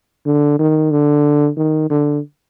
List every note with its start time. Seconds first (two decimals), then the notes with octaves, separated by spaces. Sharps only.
0.26 D3
0.59 D#3
0.91 D3
1.57 D#3
1.90 D3